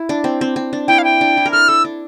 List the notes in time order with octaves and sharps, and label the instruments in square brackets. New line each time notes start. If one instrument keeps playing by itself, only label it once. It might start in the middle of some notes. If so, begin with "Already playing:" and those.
Already playing: [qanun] E4
D4
C4
C4
C4
D4
[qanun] E4 [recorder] G5
[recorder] F5
G5
[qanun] D4
E4
A#4
[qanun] A4 [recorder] F6
[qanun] A4 [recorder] E6
[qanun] D4